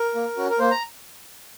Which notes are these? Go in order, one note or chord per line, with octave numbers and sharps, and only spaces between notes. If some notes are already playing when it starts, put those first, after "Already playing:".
Already playing: A#4
A#3
C#4 F#4
A#4
A#3 C5
A#5